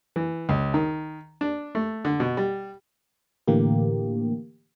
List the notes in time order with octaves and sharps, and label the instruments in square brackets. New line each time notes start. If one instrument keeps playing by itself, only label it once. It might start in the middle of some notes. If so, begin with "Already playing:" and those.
[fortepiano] E3
C#2
D#3
D4
A3
D3
B2
G3
[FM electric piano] A2 D3 E3 A#3 G4